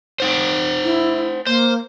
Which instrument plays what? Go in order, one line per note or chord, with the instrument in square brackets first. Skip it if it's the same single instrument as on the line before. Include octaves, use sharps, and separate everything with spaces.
[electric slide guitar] C5 F#5 G5
[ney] E4
[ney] A#3 [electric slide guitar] C5